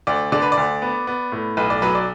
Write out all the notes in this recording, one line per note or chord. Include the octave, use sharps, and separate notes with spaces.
D2 D5
D3 D5
B4
D5
D2
B3
B3
A2
B1 B4
D5
F#3 B4
D5